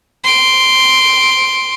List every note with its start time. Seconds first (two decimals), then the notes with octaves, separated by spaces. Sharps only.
0.24 C6 D7